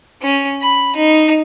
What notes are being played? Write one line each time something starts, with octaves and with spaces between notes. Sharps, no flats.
C#4
B5
D#4